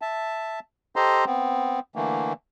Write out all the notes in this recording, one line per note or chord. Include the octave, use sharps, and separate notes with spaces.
E5 A5
G4 A4 C5 D#5 A#5 C6
B3 C4
D3 E3 A3 A#3